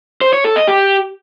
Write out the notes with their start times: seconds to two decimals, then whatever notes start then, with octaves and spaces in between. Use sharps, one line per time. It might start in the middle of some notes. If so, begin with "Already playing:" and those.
0.21 C5
0.33 C#5
0.44 A4
0.56 D#5
0.67 G4